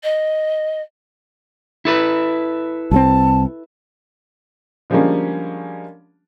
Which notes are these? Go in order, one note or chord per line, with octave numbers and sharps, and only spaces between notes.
D#5
E4 A4 B4
C2 F#3 C4 A5
D3 F3 G3 G#3 A#3 C#4